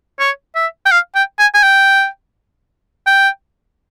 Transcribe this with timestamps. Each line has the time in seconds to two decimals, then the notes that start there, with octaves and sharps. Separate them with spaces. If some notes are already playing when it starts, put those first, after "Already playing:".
0.19 C#5
0.55 E5
0.86 G5
0.91 F5
1.15 G5
1.39 G#5
1.54 G#5
1.63 G5
3.07 G5